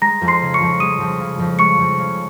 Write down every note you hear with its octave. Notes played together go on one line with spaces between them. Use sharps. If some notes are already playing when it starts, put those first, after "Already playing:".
G#3 A#5 A#6
F2
C6 C7
C#3
C#6 C#7
F2
G#3 D#6 D#7
F2
C#3
F2
G#3 C#6 C#7
F2
C#3